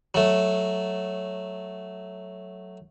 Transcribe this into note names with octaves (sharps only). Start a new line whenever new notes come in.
F#3 A3